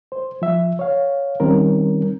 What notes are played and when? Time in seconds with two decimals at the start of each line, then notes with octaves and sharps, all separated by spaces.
0.12 C5
0.42 F3 E5
0.79 C#5 F5
1.40 D#3 G3 C4 C#4 A#4